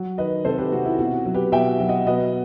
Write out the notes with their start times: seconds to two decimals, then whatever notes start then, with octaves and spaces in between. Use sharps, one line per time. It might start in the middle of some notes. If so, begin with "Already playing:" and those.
Already playing: F#3
0.18 D#3 B4 D#5
0.45 C3 A4 C5
0.58 G4 B4
0.72 C3 F#4
0.85 E4
0.99 B2 F#4
1.25 F#3
1.34 G4 B4
1.52 B2 E5 G5
1.79 F#3
1.89 D#5 F#5
2.06 B2 B4 D#5